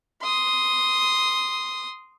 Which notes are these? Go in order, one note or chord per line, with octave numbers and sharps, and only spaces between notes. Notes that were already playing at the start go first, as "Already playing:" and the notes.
C6 D#6